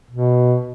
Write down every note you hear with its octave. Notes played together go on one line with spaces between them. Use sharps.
B2